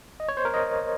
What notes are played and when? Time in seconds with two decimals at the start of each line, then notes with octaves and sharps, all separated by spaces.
0.20 D#5
0.29 C#5
0.37 C5
0.45 A#4
0.54 D#5